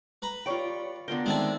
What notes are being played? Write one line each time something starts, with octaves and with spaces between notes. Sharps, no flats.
B4 A#5 B5
G3 F4 C#5 D5 G5
D3 A#3 B3 F4 A#4 G5
D#3 G#3 C4 D4 E5 A5